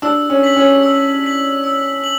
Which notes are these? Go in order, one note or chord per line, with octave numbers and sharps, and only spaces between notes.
D4 E6
C#4
B6 F#7
C#4
E6
B6 F#7
E6
F#7